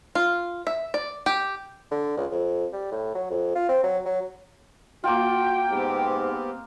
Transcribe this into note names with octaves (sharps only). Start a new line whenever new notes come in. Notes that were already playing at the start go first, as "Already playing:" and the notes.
F4
E5
D5
G4
D3
C#2
F2
G3
A2
F#3
F2
F4
C4
F#3
F#3
A#3 F4 F#4 G5
G#2 B3 C4 G4